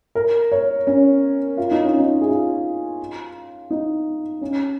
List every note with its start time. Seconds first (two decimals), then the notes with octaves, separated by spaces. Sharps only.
0.15 A#4
0.52 C#5
0.87 C#4
1.57 F4
1.71 D#4
1.85 C#4
1.98 D#4
2.21 G#4
2.28 F4
3.70 D#4
4.41 C#4